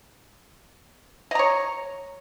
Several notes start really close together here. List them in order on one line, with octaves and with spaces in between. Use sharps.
D#5 A#5 C#5